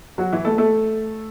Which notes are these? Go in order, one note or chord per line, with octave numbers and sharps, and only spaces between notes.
F#3 F#4
E3 E4
A3 A4
A3 A4